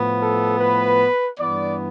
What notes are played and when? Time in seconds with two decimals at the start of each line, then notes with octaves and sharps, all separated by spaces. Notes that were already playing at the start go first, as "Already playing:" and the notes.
Already playing: A2 F3 B3
0.20 A4
0.59 B4
1.39 G2 E3 B3 D5